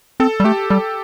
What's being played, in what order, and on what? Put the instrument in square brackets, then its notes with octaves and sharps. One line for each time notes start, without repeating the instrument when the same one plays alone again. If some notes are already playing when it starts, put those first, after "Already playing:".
[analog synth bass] C4 [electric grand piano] A4
[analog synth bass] G3
[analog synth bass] A3 [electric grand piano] G4
[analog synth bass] G3 [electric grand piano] A4